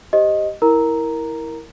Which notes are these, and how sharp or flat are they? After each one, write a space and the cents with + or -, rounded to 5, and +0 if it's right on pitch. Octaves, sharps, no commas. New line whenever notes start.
G4 +0 C5 +0 D#5 +0
E4 -15 A#4 +0 A#5 +0